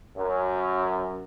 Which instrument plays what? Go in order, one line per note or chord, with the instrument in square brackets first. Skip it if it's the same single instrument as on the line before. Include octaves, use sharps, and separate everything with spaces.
[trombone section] F#2